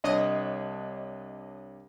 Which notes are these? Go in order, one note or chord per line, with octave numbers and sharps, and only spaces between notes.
C2 D4 C#5 D#5